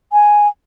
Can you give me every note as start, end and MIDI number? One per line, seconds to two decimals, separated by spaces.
0.13 0.48 80